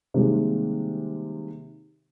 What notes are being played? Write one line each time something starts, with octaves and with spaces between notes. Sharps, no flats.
C3 D#3 G3 G#3 A#3